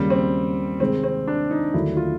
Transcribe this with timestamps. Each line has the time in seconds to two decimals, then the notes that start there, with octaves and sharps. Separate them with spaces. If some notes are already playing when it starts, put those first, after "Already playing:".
Already playing: D#2 C#3 F#3 G3 A#3 C#4
0.10 C4
0.80 C3 D#3 G#3 C4
1.04 C4
1.28 D4
1.51 D#4
1.74 D#2 D3 F#3 A3 E4
1.97 F4